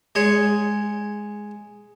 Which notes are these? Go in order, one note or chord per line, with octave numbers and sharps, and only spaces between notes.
G#3 C#5